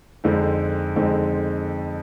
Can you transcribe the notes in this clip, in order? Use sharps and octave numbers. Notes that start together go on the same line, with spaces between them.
F2 D3 G#3 C4 D#4
F2 D3 G#3 C4 D#4